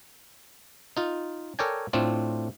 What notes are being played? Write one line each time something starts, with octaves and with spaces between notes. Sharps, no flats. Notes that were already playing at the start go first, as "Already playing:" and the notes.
D#4 F4
A4 A#4 C#5 D5 G5 G#5
A2 A3 C4 D4 F4